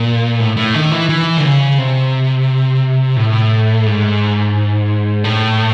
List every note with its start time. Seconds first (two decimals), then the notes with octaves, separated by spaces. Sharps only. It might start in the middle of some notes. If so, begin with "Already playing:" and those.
Already playing: A#2
0.40 A2
0.57 A2
0.74 D#3
0.91 E3
1.09 E3
1.37 D3
1.43 C#3
1.78 C3
3.16 A2
3.86 G#2
5.24 A2